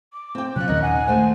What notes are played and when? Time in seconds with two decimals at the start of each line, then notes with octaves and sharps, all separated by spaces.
0.13 D6
0.35 C4 G5
0.56 C3 F#3 C#4 F4 F#6
0.68 A#1 D#2 D#3 C#4 A#4 D#5
0.82 F#5 G#5
1.08 G#3 A3 C5